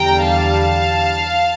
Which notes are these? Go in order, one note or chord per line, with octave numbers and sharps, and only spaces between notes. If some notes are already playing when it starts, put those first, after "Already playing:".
Already playing: E2 D3 G3 G5 A#5
F5 A5